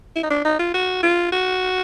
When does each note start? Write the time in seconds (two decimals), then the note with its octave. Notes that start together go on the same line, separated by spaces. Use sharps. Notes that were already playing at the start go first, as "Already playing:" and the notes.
0.16 E4
0.23 D#4
0.30 D4
0.45 D#4
0.59 F4
0.74 F#4
1.03 F4
1.32 F#4